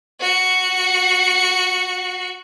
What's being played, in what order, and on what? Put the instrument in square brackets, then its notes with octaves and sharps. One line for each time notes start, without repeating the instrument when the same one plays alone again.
[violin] F#4 C#7